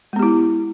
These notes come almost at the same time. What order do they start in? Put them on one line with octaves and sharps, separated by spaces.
G#3 B3 G4 E4